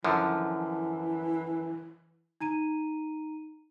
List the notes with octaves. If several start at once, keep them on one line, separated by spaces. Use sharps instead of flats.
F#2 D3 E3 F3
D#4 A#5 D#7